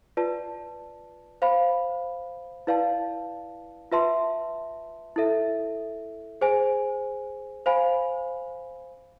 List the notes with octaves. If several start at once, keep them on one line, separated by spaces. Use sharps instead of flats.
F4 B4 D5 A5
C5 F5 B5
E4 B4 D5 F5 A5
F4 B4 E5 A5 C6
E4 A4 E5
G#4 C5 G#5
C5 F5 G#5 B5